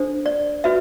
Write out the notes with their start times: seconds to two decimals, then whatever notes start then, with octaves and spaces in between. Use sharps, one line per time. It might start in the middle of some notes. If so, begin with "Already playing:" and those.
Already playing: D4 A4 C5
0.26 D5
0.64 F#4 B4 E5